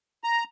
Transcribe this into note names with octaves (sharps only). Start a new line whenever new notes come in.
A#5